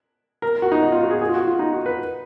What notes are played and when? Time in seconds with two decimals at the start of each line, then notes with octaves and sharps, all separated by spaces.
0.42 A#4
0.62 F#4
0.72 D#4
0.82 D#4
0.92 F4
1.02 F#4
1.11 G#4
1.21 G#4
1.29 F4
1.34 F#4
1.47 F4
1.59 D#4
1.72 F#4
1.86 B4